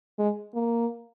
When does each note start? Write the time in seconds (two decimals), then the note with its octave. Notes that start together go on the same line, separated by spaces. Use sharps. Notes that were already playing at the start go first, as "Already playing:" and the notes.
0.19 G#3
0.55 A#3